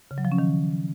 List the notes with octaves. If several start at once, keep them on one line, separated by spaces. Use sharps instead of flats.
C#3
F#3
F3
C#4
D#3